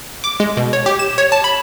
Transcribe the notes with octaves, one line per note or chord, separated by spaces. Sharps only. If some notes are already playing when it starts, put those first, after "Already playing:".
D6
G#3
B2
C#5
G4
E7
C#5
A5
B5